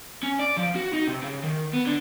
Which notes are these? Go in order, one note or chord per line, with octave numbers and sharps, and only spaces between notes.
C#4
D5
F3
F#4
D#4
C3
C#3
D#3
B3
D3